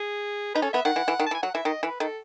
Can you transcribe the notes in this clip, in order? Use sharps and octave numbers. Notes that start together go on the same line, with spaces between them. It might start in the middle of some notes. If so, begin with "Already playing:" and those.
Already playing: G#4
D#4 B4
C#4 A4
B3 E5
D#3 F#5
E3
E3
D#3
A5
E3
G#5
F#3 F#5
E3 E5
D#3 D#5
E3 B4
D#3 A4